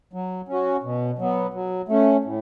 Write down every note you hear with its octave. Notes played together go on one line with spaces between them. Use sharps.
F#3
C#4 F#4
B2
F#3 B3
F#3
A3 C#4
A2